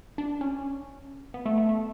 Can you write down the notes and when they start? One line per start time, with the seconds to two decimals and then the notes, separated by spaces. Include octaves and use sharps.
0.18 D4
0.41 C#4
1.34 B3
1.46 A3
1.58 A3
1.69 A3